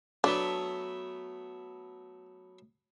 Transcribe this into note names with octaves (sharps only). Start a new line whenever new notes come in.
F#3 A3 B3 D4